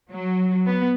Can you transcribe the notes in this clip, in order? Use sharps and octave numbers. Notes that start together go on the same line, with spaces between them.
F#3
B3